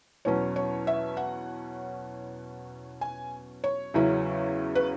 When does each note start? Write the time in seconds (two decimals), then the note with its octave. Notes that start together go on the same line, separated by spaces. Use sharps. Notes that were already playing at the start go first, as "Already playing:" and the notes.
0.25 E2 B2 F#3 C#4 C#5
0.56 C#5
0.87 E5
1.17 F#5
3.01 G#5
3.64 C#5
3.94 E2 C#3 F#3 C#4 E4
4.75 B4